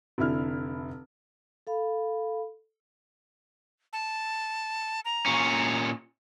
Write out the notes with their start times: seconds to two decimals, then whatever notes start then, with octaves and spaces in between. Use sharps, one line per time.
0.18 F1 D3 E4 F6
1.67 A4 F5 B5
3.93 A5
5.05 A#5
5.26 A#2 C#4